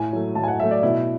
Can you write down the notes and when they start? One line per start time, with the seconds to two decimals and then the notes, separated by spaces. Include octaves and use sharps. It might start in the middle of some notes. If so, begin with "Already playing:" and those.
Already playing: A2 G#5
0.13 F#3 A3
0.35 A2 A5
0.43 G#5
0.48 F#5
0.60 F#3 A3 E5
0.71 D5
0.83 B2 E4